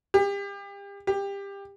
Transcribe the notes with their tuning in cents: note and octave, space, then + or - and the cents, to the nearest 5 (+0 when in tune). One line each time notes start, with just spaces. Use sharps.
G4 +35
G4 +20